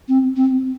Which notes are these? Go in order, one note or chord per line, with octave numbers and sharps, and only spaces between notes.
C4
C4